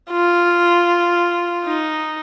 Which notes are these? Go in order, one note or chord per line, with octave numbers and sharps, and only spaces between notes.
F4
D#4